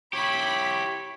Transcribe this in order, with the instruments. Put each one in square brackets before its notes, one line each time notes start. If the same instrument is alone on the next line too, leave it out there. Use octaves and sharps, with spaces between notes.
[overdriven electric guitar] E4 G4 [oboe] C#5 [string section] B5 B6